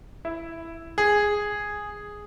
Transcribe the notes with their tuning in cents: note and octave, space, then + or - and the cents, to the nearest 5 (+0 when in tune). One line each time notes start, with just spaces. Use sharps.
E4 +0
G#4 -5